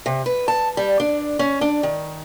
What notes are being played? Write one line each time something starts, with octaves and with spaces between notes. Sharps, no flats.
C3
B4
A5
G3
D4
C#4
D4
D#3